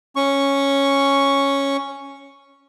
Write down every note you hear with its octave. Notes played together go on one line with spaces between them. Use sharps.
C#4 C#6